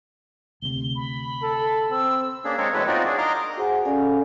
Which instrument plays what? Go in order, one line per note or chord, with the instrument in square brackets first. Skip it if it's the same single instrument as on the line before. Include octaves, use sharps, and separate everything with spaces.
[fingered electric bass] D2 C3 [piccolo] G7
[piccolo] B5
[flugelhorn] A4
[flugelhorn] C4 [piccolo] E6
[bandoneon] A#3 C#4 D4 G#4
G#3 C4 A4 A#4 C#5
E2 A2 F#3 G#3 A4 B4
C4 D#4 F4 F#4 A#4 D5
D4 G#4
A#4 D#5 A#5 C6 D6 F6
[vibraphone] F#4 G#4 C5 F#5 G#5
C#4 A4 D5 F5 G#5